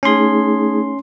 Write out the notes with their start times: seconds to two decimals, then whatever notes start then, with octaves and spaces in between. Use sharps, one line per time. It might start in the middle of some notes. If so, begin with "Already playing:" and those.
0.03 A3 C#4 D#4 G#4 C6